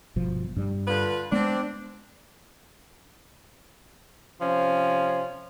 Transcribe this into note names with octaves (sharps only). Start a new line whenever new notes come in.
G1 B2 F3
G2 G3
D3 F4 B4
G#3 B3 C4 D4
C3 F3 C#4